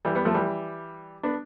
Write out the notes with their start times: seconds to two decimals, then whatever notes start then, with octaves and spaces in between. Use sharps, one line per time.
0.05 E3 G3
0.15 G3 B3
0.25 F3 A3
0.34 E3 G3
1.23 B3 D4